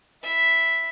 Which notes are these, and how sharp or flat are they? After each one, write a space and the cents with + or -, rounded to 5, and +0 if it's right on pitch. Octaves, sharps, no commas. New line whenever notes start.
E4 +0 E5 +0